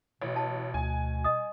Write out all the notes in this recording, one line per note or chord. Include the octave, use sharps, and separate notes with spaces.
A1 B2
A5
D2 G#5
D#5 D#6